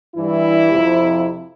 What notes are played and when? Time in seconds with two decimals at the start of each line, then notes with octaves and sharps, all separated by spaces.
0.15 G2 E3 G3 E4
0.71 F2 C3 F3